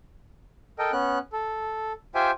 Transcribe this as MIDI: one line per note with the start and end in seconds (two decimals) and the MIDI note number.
0.79 0.91 69
0.79 0.91 70
0.79 0.91 75
0.79 0.91 79
0.92 1.18 59
0.92 1.18 61
0.92 1.18 90
1.33 1.92 69
2.15 2.31 65
2.15 2.31 67
2.15 2.31 72
2.15 2.31 76
2.15 2.31 79
2.15 2.31 80